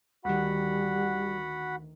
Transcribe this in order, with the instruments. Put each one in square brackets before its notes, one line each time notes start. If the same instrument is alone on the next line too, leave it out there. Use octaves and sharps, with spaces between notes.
[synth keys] D2 D#3 [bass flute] G3 [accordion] F#4 F#5 B5